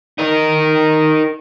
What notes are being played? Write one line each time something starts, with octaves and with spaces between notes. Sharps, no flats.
D#4 A#4